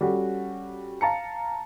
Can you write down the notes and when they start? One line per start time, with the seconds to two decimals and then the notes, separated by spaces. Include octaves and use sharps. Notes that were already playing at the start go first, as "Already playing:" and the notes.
0.01 G3 C#4 F#4 A4
1.01 F5 A5 A#5 C#7